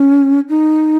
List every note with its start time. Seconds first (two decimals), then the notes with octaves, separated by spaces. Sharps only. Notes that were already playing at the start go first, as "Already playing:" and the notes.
Already playing: C#4
0.49 D#4